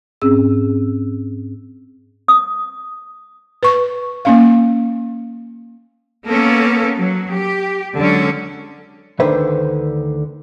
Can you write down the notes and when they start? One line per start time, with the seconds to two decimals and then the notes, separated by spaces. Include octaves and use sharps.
0.22 G#2 C4 C#4 G#4 E6
2.28 D#6
3.63 B4 C#6
4.25 A#3 C#4 F5
6.28 A#3 B3 C#4 A4
6.98 F#3
7.30 G4
7.98 D3 F#3 G#3 C#4
9.20 D2 D3 D#3 B4 C5 E5